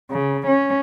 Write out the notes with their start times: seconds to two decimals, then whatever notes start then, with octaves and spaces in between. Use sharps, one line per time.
0.10 C#3
0.47 C#4